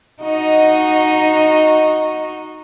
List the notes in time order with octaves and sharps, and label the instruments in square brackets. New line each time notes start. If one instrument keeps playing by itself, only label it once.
[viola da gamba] D#4 F#4 D#5